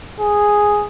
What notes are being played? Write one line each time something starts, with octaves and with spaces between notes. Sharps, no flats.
G#4